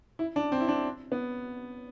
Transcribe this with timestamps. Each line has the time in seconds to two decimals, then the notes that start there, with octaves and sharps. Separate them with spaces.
0.19 E4
0.36 D4
0.52 C4
0.60 E4
0.68 D4
1.12 B3